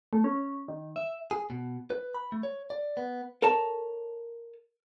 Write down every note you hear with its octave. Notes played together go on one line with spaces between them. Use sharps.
A3
C#4
D#3
E5
G#4
B2
B4
B5
A3
C#5
D5
B3
A4 A#4 C#5 A5